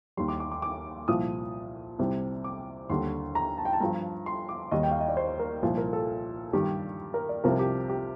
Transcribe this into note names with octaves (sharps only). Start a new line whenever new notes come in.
D#2 D#3 G3 C6
D6
D6
D6
D6
C2 A#2 F3 D#6
C2 C3 G3
D6
D#2 D3 G3 C6
A#5
A5
G5
A5
G2 F3 A#5
C6
D6
D#2 D#3 G3 D#5
G5
F5
D#5
D5
C5
A#4
C2 A#2 F3
A#4
A4
G2 D#3 G3 G4
A#4
D5
C2 C3 F3 A#4
G4
G4